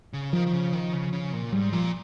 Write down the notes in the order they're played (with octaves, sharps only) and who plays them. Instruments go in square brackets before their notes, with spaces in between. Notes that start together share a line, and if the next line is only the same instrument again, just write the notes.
[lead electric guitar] C#3
[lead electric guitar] D#3 [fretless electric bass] F3
[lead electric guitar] D#3
C#3
D#3
C#3
C#3
A#2
[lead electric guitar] G#2 [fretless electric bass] G3
[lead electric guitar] A#2 [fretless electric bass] F3